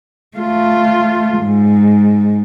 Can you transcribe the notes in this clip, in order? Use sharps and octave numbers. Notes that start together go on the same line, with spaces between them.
A3 F4
G#2